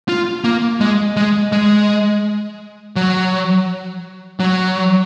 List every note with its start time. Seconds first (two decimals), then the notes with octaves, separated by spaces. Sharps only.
0.09 F4
0.44 A#3
0.80 G#3
1.17 G#3
1.52 G#3
2.96 F#3
4.40 F#3